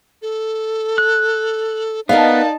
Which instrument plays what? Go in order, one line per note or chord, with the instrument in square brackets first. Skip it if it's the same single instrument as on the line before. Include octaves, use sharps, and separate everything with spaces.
[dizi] A4
[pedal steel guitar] F#6
[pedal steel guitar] B3 [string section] D#4 A5 [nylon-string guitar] A#4 D#5 F5 [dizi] D5